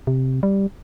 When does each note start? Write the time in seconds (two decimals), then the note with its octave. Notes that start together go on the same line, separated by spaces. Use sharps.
0.07 C3
0.43 G3